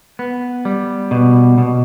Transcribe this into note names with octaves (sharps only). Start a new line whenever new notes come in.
B3
G3
B2
B2